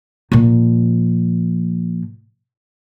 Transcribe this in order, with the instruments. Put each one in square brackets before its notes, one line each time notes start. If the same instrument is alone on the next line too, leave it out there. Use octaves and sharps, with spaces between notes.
[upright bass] A#2 F3